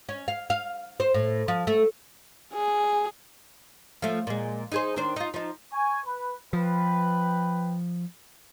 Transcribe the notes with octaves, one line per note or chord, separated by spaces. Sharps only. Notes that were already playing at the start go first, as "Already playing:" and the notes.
C#4
F5
F5
C5
A2
F3
A3
G#4
F3 A3
A#2 G#3
D#4 G#4 C5
D#3 D4 C5
D#4 F4
F3 D#4
G#5 C#6
B4
F3 B4 G5